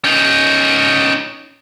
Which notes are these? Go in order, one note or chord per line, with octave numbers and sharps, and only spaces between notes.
C#4 D#4